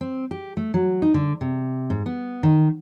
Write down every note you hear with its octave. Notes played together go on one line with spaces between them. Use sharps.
C4
G4
A3
F#3
D#4
D3
C3
G#2
B3
D#3